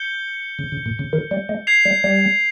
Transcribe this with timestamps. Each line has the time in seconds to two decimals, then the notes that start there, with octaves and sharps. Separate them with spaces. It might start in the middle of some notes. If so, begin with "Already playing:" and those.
Already playing: G6 C#7 G7
0.59 C#3
0.72 C#3
0.86 A#2
0.99 C#3
1.13 D#3
1.31 G3
1.49 G#3
1.67 G#6 C7 F7
1.85 G3
2.04 G3